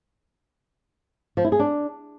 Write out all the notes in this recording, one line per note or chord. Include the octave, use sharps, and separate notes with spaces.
F3
E4
G#4
D4